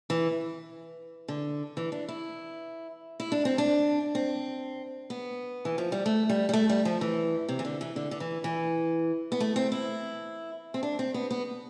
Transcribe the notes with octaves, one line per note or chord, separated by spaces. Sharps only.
E3
D3
E3
D4
E4
E4
D4
C4
D4
C4
B3
E3
F3
G3
A3
G3
G3
A3
G3
F3
E3
C3
E3
D3
E3
D3
D3
E3
E3
B3
A3
C4
E4
C4
D4
C4
B3
B3